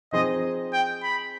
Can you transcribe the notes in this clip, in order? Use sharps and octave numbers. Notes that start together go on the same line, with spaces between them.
F3 C4 D#4 G#4 C5 D#5
G5
B5